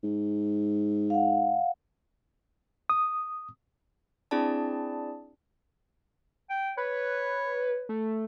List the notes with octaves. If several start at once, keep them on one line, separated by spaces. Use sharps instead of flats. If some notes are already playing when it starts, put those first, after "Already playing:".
G#2
F5 F#5
D#6
C4 D4 E4 G#4 D5 A5
G5
B4 C#5
A3